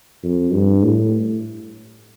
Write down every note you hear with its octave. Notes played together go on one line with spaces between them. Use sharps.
F2
G2
A2